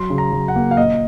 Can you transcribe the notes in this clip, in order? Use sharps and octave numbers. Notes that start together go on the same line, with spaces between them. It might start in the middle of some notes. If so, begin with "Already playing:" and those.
Already playing: F#3 C6
C#3
A#5
F#3
F#5
A#3
F5
A#2 D#5